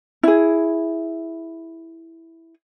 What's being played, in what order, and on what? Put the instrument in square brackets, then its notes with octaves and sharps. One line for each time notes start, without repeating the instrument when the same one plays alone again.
[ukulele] E4 G#4